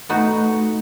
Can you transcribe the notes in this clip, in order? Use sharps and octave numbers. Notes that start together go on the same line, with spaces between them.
A3 B3 D#4 F#4